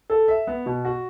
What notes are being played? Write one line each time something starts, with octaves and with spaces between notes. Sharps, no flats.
A4
E5
B3
B2
F#4